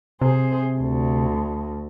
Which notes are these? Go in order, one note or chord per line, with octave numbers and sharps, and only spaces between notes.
C3 G#4 C5
D2